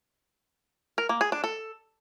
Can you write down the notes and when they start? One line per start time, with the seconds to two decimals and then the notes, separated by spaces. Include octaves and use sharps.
0.98 A#4
1.09 A#3
1.21 G#4
1.32 D4
1.44 A4